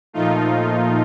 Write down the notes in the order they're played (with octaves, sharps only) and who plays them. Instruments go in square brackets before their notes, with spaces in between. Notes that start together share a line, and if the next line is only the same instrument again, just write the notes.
[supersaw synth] A#2 F3 A3 D#4 F4